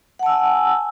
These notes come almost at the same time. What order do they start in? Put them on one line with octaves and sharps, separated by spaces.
F#5 A5 E6 G#5